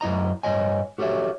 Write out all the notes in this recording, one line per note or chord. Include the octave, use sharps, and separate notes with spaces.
F#2 E4 D#5 A#5
G2 D#3 C#5 D#5 G#5
F#4 G4 A4 C#5 E5